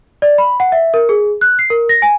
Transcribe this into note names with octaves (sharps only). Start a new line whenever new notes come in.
D5
B5
F#5
E5
A#4
G#4
F#6
C7
A#4
A#6
G#5